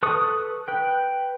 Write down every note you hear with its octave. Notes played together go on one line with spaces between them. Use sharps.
A4 B4 C#6 D#6
B4 G5